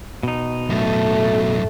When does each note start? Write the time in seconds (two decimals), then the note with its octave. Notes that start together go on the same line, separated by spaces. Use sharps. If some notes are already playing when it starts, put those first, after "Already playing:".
0.23 B2 D#4
0.69 F#2 A2 A3 A4